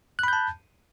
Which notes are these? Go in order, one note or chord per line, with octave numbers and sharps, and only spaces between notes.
A5 B5 F#6 G6